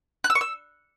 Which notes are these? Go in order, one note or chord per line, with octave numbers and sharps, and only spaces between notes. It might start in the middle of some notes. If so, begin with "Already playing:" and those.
F#6
E6
C#6
E6